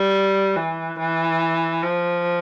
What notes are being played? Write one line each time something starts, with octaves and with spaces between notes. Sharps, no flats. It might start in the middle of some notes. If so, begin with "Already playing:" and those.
Already playing: G3
E3
E3
F3